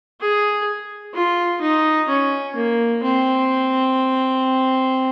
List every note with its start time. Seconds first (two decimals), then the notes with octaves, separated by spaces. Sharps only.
0.21 G#4
1.14 F4
1.62 D#4
2.09 C#4
2.56 A#3
3.03 C4